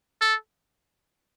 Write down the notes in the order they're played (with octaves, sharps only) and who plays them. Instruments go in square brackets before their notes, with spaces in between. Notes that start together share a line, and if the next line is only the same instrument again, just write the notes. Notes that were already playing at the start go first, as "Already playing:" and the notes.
[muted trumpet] A4